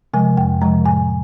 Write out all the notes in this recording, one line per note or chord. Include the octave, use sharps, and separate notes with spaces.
C3 F3 G#3 G#5
F2 G5
C3 F3 G#3 A#5
A2 G#5